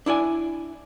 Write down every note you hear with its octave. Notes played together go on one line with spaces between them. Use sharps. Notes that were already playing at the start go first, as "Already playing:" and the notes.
D4 E4 D5 G#5